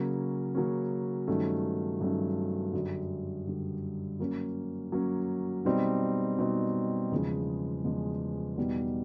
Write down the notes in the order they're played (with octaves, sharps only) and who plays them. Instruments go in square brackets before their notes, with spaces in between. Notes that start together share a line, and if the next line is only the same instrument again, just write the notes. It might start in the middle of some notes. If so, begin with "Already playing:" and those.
Already playing: [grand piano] C#3 F#3 A#3 C#4
C#3 F#3 A#3 C#4
G2 D#3 F#3 A3 C#4
G2 D#3 F#3 A3 C#4
F#2 D3 G3
F#2 D3 G3
F#3 A#3 C#4
F#3 A#3 C#4
B2 G3 C4 D#4
B2 G3 C4 D#4
E2 C#3 F3 G#3
E2 C#3 F3 G#3
E2 B2 G3 B3 D#4